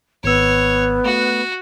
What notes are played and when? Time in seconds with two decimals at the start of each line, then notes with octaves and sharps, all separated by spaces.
0.24 G#1 B3 C#5 E6
1.05 A3 F#4